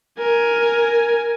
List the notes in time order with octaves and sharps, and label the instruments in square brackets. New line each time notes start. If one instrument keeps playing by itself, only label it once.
[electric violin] A#4 G#5